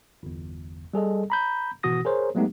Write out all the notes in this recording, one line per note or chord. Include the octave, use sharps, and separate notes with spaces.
G1 E2
G3 G#4 A4 D#5
A#5 B5 G6
G#1 B2 E3 F#4 D#6 A#6
G#4 A#4 C5 C#5
F#3 G#3 A3 B3 D#4 G4